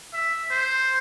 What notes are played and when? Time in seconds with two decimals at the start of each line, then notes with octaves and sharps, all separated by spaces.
0.14 E5
0.51 C5